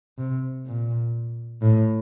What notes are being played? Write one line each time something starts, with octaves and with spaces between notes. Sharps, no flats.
C3
A#2
A2